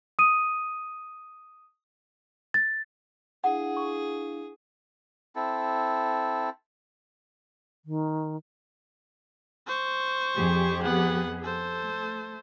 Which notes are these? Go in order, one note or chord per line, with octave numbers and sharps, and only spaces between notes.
D#6 D#7
A6
D4 E4 G#4 F5 F#5
C#6
C4 E4 A4
D#3
C5 C#6
F2 G4 G#4
B3 F#5
A4 C5
A3